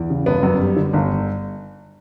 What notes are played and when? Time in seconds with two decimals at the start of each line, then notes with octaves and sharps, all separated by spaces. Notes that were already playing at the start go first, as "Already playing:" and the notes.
Already playing: E2
0.10 C#3
0.26 G1 B3
0.43 F#2
0.60 G3
0.76 D3
0.93 G1